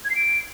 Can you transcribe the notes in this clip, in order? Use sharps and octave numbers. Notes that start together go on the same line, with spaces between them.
G#6
C7
D7